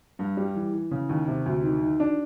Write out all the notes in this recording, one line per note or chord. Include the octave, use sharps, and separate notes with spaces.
G2
G3
E3
E3
C#3
D#2
C3
D2
D#3
D#3
D4